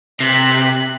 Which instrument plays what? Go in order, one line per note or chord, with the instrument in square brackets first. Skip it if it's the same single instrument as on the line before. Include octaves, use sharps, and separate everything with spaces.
[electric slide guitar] C3 [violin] F#6 B6